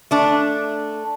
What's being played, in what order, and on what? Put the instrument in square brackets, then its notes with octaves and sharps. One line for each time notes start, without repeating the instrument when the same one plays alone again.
[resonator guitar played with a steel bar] A3 D4